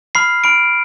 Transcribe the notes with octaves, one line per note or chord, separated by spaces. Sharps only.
B5 F6 C7
B5 F6 D7